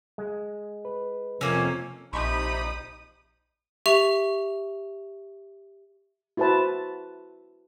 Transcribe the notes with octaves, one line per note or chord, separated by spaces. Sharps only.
G#3
B4
F2 C3 A3 A#3 C#4 E6
A#1 C3 D#4 B5 D#6
G4 E5 C#6 F7
E4 F#4 B4 C5 A5